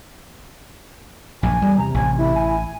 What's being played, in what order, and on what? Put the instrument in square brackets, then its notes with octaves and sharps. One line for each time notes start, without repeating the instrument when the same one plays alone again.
[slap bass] A#1 F#2 [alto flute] G#5
[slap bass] E2 [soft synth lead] G3
[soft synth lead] C3 [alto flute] A#5
[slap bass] A1 [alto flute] G#5
[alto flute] E4
[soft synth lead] G#5